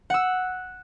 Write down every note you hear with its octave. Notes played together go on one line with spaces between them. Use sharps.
F#5 E6